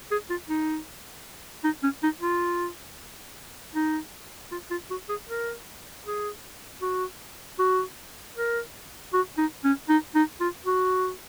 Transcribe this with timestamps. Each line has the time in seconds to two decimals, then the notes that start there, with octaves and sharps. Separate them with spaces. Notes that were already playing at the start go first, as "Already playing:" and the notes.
0.11 G#4
0.30 F4
0.49 D#4
1.64 D#4
1.83 C#4
2.03 D#4
2.22 F4
3.75 D#4
4.51 F4
4.71 F4
4.90 F#4
5.09 G#4
5.29 A#4
6.06 G#4
6.82 F#4
7.59 F#4
8.36 A#4
9.13 F#4
9.38 D#4
9.64 C#4
9.89 D#4
10.15 D#4
10.40 F4
10.66 F#4